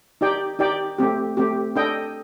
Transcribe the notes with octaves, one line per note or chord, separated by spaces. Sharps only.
D#4 G4 D5 G5
D#4 G4 D5 G5
A3 C4 G4
A3 C4 G4
D4 A4 D#5 G5